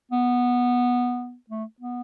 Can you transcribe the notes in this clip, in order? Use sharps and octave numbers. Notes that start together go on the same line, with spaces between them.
B3
A3
B3